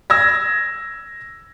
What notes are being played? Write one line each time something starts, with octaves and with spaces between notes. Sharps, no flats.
E6 G#6 A#6